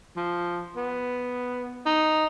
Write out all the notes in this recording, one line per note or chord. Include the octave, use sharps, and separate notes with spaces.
F3
B3
D#4